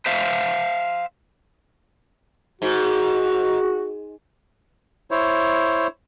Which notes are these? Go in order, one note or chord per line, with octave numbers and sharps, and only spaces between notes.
C5 E5 F5
G#2 F#4
E4 C5 C#5